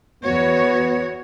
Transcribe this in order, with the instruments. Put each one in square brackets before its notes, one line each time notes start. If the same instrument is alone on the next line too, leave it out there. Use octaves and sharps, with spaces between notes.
[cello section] E2 F#4 C#5 [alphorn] B3